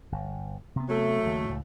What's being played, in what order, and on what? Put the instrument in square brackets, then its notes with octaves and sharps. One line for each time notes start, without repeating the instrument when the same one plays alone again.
[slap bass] G1
C3 B3
[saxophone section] F#3 A3
[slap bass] D#2 C#3
C#2 A2